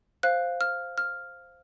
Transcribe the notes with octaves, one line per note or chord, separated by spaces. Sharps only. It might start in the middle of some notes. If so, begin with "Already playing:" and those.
C5 F5 F#6
F6
F6